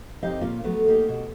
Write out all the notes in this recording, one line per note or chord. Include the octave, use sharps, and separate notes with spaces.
F#2 C4 D#4 G4 D#5 F5
A#2 A#3 C#4 F4
F#3 A3 B3
A#3 D#4 G4
B2